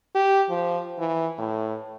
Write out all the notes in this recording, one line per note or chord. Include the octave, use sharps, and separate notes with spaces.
G4
F3
E3
A2